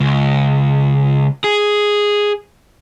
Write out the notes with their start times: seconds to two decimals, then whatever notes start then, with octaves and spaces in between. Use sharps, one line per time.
0.01 C#2
1.44 G#4